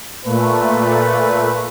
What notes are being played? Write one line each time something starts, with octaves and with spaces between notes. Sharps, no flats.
A#2 A3 B4